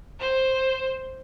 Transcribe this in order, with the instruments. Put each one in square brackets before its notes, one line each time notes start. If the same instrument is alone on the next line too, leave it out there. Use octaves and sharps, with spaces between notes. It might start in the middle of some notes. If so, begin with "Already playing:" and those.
[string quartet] C5